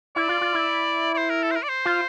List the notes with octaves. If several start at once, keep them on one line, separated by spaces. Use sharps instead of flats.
E4 D5
F4
F4
E4
D5
C5
A#4
A4
C5
A#4
D5
C5
F4